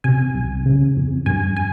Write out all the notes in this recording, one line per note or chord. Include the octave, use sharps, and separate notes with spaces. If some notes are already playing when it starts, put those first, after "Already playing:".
C3 G#5
C2
C#3
F2
G2 G#5
G#5